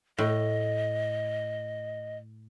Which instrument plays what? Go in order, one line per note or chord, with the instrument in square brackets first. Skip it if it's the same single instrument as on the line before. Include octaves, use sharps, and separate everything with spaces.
[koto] A2 [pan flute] D#5